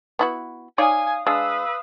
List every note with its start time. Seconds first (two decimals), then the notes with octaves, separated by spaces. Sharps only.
0.19 B3 E4 F#4
0.78 D#4 C#5 D5 F5 G#5 D#6
1.27 G#3 D4 B4 F5 D#6 E6